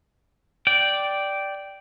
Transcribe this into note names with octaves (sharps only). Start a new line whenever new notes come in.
D5 G5